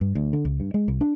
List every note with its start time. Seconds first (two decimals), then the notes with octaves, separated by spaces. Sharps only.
0.01 G2
0.15 D2
0.33 D3
0.45 C#2
0.60 G2
0.74 G#3
0.88 C2
1.01 D4